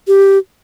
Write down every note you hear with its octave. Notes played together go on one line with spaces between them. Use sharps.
G4